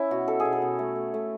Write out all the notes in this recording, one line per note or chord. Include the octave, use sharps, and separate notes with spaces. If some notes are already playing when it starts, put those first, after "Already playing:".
Already playing: C#4 E4
B2 F#4
B2 A4
G#4
B2
A4
B2
A3
A3
A3